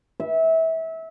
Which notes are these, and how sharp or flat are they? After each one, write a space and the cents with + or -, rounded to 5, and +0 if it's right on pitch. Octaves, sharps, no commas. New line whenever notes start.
E5 -25